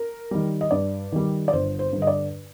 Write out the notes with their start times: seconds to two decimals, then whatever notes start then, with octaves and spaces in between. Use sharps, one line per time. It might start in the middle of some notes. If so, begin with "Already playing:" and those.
Already playing: A#4
0.31 D#3 G3
0.61 D#5
0.71 G2 D5
1.12 D#3 G3
1.48 D5
1.53 G1 C5
1.79 C5
1.92 G2
1.98 D3 D#5
2.07 D5